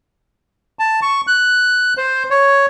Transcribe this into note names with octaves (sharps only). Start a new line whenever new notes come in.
A5
C#6
F#6
C5
C#5